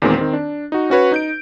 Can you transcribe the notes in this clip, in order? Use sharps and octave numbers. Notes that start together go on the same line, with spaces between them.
E2 A#2 D#3 G#3 C4
D#3 C4
D4
D#4 F#4
C#4 F#4 B4 C#5
D#4 G6 D7